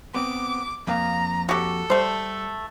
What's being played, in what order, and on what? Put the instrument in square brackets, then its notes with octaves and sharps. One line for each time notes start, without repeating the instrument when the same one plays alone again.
[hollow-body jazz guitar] B3 C4 [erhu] D6
[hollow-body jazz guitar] F2 A#3 F5 [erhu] A#5
[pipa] F#4 G4 [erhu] A4
[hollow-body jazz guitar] G3 [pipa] A3 C5